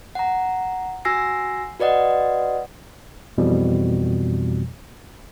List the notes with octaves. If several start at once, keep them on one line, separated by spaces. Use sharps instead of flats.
F#5 A#5
F#4 G#5 E6 A#6 C7
F#4 B4 D5 D#5 F#5
F2 B2 E3 F3 G3